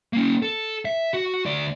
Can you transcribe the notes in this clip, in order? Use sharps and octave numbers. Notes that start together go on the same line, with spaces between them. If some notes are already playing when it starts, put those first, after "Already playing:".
A#3 C#4
A4
E5
F#4
D2 D5